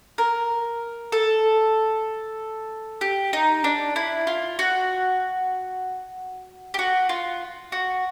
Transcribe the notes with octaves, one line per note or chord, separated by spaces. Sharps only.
A#4
A4
G4
D#4
D4
E4
F4
F#4
G4
F#4
F4
F#4